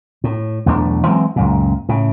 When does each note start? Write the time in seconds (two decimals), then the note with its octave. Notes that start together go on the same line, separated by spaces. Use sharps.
0.24 A2
0.66 B1 E2 A3 D4
1.07 E3 F#3 G#3 C4
1.36 C#2 F#2 A#2
1.89 A2 C#3